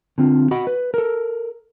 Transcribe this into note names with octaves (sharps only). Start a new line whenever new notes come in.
D3 C4 F4
F#4 D#5 F#5 B5
B4
A4 A#4